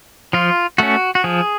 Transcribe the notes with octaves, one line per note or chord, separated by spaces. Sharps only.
F3 F4
A3 C#4 F#4
F#4
F3 G#4